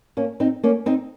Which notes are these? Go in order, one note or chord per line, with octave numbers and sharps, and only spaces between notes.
A#3 C#4
C4 D#4
A#3 C#4
C4 D#4